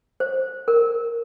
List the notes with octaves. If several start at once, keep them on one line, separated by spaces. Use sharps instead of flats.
C5
A#4